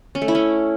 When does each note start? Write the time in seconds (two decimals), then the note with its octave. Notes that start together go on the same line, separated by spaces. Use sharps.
0.15 C#4
0.22 A3
0.28 E4
0.35 C#4